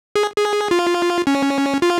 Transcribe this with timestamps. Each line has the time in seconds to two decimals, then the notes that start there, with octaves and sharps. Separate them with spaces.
0.16 G#4
0.37 G#4
0.71 F4
1.27 C#4
1.82 F4